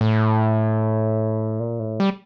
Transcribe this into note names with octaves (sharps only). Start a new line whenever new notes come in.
A2
A#2
A2
G3